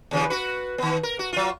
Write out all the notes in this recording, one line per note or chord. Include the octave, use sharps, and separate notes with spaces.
D#2 C#3 F3
F#4 B4
D#3 B3
A#4
F#4
F#3 F4